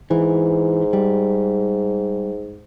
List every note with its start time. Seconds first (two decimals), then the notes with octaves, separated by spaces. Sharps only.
0.11 G#2 E3
0.93 G3